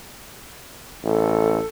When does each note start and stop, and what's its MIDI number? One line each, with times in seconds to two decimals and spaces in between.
1.04 1.59 33
1.04 1.66 69